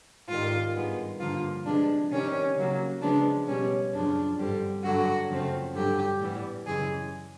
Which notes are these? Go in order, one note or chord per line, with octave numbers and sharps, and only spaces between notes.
G#2 D#3 G3 F4
G2 D#3 G#3 B3
G2 D3 F3 A#3 F4
C3 F3 G#3 B3 D4
C3 D#3 G3 C#4
C#3 F#3 A#3
C#3 F3 G#3 B3 D4
B2 G3 B3 C#4
F#2 C#3 F3 D4
G2 D3 G3 C4
G2 D3 F#3 F#4
F#2 C#3 F3 A3 C4
G2 D3 F#3 G4
A2 E3 G3 B3
F#2 C#3 E3 G#3 G#4